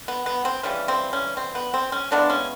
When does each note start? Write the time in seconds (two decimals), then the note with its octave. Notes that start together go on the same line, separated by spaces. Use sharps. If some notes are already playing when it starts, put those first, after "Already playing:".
0.08 B3
0.26 B3
0.45 C4
0.63 C#3 E3 G3 C#4
0.88 C4
1.13 C#4
1.37 C4
1.55 B3
1.74 C4
1.92 C#4
2.11 C#3 E3 G#3 B3 D4
2.30 C#4